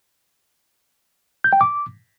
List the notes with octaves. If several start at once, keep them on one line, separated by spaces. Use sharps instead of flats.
G6
G5
D6